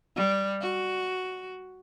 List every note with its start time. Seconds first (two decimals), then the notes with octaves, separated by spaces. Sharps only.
0.16 G3
0.61 F#4